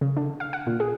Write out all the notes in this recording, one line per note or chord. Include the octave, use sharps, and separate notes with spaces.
C#3
D3
F5
F#5
A#2
G#4